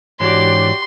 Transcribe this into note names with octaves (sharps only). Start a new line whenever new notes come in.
G#2 E3 D4 F#4 G4 C#5 D5 C6